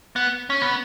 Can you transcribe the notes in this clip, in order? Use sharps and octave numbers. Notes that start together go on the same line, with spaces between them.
B3
C#4
B3